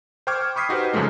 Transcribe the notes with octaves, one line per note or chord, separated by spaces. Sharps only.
C5 G5 C#6 D6 F6 G#6
B5 C#6 D#6 B6 C7
D#4 F#4 G4 B4 C5
F#2 C#3 F3 G#3 A3 D#4